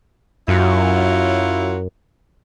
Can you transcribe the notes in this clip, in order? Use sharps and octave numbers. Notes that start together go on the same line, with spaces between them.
F#2 F#3 E4 F4